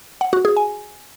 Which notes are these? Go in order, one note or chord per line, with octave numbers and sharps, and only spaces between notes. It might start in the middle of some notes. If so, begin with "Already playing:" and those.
F#5
F#4
G#4
G#5